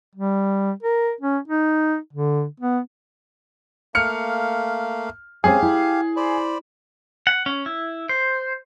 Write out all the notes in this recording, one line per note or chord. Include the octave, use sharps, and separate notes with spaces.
G3
A#4
C#4
D#4
D3
B3
A3 A#3 F5 F6 C#7
G#3 C4 C#4 G4 G#4 F5
E4
C5 D5 B5
F#5
C#4
E4
C5